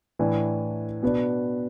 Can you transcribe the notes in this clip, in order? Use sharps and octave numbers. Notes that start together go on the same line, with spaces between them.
A2 E3 D4
B2 B3 D4